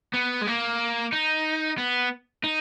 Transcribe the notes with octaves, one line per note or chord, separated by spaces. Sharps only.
B3
G#3
A#3
D#4
B3
D#4